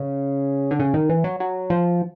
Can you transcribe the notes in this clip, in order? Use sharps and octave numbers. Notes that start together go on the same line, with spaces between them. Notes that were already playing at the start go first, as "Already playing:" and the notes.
Already playing: C#3
D3
C#3
D#3
E3
F#3
F#3
F3